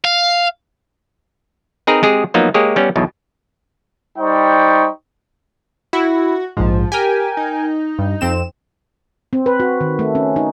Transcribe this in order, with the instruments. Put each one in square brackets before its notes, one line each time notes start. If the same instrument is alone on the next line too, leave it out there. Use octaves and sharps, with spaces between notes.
[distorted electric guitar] F5
[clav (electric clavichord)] C4 D#4 G#4 A#4 B4 A#5
G#3 C4 G4 G#4
F3 F#3 A#3 B3 D#4
G#3 A#3 G4 G#4 C#5
G3 B3 C#4
B1 E2 B2
[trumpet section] G3 D#4 C5 G5 C#6
[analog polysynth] E4 [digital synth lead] F#4
[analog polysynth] A#1 G#2 [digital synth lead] F3
[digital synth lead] G4 [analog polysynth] A#4 G5 G#5
[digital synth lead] D#4
[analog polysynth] G2
F2 C4 E7
[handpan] C4
B4
F#4
D#3
A3
C#4
D#4